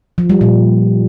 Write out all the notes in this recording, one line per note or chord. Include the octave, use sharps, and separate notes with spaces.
F3
G3
A#2